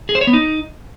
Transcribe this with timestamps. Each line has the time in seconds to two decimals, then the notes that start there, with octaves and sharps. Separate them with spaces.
0.09 G#4
0.15 C5
0.21 C#5
0.27 B3
0.33 D#4